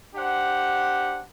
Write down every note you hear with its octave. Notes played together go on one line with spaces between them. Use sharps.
D4 G4 C5 F#5